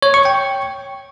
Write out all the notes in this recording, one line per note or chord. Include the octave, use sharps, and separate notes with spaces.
C#5
C#6
G5